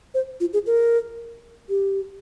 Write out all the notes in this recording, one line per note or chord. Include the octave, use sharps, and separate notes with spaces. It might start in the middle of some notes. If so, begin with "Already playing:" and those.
C5
F4
G#4
A#4
G4